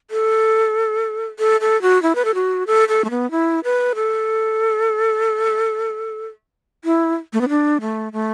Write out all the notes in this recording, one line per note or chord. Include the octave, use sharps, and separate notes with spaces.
A4
A4
A4
F#4
E4
B4
A4
F#4
A4
A4
A3
B3
E4
B4
A4
E4
A3
B3
D4
A3
A3